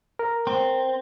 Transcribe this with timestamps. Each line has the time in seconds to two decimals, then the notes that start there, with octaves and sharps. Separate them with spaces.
0.19 A#4
0.47 C4